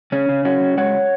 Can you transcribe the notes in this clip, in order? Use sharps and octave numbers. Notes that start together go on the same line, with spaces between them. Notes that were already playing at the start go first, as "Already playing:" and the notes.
C#3 C#4
C#3
F#2 C#4 F#4
C#3
G#3 C#5 F#5